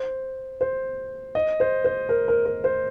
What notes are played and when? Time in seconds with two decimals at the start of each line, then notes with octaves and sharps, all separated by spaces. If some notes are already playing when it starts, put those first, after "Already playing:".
Already playing: C5
0.61 C5
1.35 D#5
1.60 C5
1.85 C5
2.09 A#4
2.28 A#4
2.46 A#4
2.64 C5